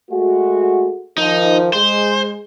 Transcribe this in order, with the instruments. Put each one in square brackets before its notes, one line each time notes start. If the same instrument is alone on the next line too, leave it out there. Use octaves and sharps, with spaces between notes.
[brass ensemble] G#3 A3 F#4
[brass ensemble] D#3 F3 [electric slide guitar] D#4
[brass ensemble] G#3 [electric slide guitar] C5